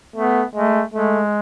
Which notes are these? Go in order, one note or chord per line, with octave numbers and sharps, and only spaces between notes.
A3 B3
G#3 A3
G#3 A3